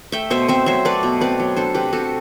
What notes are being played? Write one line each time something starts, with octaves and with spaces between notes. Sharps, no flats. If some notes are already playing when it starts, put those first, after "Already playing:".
A3 E5 G5
B2 C5 E5
C4 C5 E5
F#3 C5 E5
A3 B4 D5
B2
C4 B4 D5
F#3
D4 A4 C5
C3 G4 B4
C3 F#4 A4